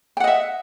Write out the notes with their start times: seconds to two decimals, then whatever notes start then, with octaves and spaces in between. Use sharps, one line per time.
0.17 G5
0.20 F#5
0.24 D#5
0.27 E5